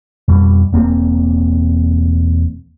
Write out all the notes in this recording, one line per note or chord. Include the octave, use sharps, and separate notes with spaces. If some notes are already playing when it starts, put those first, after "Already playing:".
F2 B2 G3
E1 A#3 C4